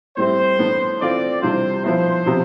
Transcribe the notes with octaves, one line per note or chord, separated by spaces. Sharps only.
A2 G3 C4 E4 C5
A2 E3 B3 D4
E3 A3 C4 F4 D5
C3 E3 G3 D4 F4 C5
F3 B3 E4 C5
C3 F3 B3